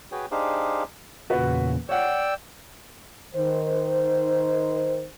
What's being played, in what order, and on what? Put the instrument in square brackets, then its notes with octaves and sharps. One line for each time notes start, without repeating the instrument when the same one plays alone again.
[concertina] F#4 G#4 B4 C#5 G5
D4 D#4 G4 G#4 C5 F5
[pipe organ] E2 A#2 C#3 [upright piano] F#4 B4
[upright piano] C#5 F#5 [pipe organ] D5 G5 E6
[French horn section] D#3 C5